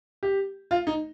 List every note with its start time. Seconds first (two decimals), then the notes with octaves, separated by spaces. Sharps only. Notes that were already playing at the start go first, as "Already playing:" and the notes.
0.23 G4
0.71 F4
0.87 D#4